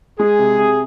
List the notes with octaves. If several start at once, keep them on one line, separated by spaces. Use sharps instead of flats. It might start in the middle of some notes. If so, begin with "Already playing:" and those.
G#3 G#4
C3
C3